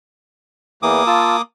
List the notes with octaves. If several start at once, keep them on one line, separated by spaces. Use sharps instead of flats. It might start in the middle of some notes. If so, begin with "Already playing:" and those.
E2 E3 A#3 D6 D#6
F4 A5 E6